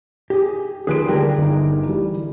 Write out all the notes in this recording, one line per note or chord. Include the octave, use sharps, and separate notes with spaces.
G4 G#4
D#2 F3 G#4 B4 C5 D7
D3 G3 D4 G#4 A#4 G5
G1 D#4
E3 G3